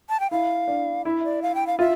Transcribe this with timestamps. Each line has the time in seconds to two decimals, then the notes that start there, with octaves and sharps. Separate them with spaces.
0.09 A5
0.20 G5
0.31 E4 F5
0.68 D4
1.05 E4 E5
1.24 D5
1.42 F5
1.55 G5
1.67 F5
1.79 F4 E5